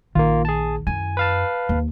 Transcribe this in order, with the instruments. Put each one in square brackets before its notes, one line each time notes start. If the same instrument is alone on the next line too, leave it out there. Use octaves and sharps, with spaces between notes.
[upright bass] A#1 [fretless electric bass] D#3 [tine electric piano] A#3 F4
[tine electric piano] G#4 A5
[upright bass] F#2 E4 [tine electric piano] G#5
[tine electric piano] B4 F5 A5
[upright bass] D#2